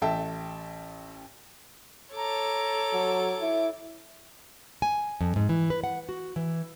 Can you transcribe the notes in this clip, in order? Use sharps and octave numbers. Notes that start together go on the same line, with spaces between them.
A1 A4 E5 G5 A5
A4 C#5 A5 A#5 D6
F#3
E4
G#5
F2
G#2
E3
B4
F#5
F#4
E3